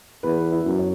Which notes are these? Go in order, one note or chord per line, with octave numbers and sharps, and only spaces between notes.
E2 B4
E4
F#2
C#5